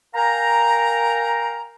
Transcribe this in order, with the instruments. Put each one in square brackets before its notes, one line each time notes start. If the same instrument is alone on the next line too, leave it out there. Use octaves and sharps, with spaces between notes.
[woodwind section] A#4 F5 G5 G#5 A#5